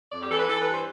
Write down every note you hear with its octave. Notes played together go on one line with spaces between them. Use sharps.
F2 D5
G4
E3 A4
B4
E3 A4
B4
G2
C5